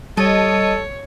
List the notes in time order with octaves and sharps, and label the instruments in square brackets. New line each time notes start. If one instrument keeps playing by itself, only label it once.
[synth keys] G3 A5 D#7 [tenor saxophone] A4 [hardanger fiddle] C#5 [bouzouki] D#5